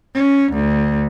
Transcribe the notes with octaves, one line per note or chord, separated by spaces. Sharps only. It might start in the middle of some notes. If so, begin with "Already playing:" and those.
C#4
D2